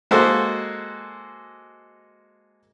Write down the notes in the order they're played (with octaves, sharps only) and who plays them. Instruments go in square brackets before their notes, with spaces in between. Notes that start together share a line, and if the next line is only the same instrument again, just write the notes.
[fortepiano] G#3 A#3 F#4 A4 C5